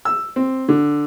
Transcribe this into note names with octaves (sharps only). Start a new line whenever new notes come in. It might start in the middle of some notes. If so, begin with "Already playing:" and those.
E6
C4
D3